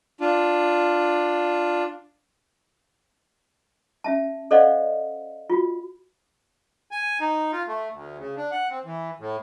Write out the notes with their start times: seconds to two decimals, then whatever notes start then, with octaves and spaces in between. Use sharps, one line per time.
0.20 D4 F4
4.04 C#4 E5 A5
4.51 A4 C5 D5 D#5 F5 F#5
5.50 F4 F#4
6.91 G#5
7.20 D#4
7.53 F4
7.68 A3
7.92 D2
8.18 C#3
8.37 D4
8.51 F#5
8.70 C4
8.85 E3
9.20 A2